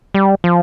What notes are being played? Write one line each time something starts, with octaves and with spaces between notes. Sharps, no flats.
G3
F3